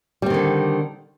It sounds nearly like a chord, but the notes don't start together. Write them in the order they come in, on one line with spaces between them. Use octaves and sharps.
G3 C4 D#3 D3